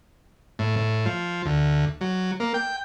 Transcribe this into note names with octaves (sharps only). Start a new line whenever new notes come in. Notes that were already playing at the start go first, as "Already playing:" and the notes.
A2
A2
F3
D2
F#3
A#3
G5